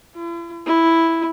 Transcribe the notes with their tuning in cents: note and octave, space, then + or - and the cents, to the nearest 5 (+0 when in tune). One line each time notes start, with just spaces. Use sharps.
E4 +45
E4 +0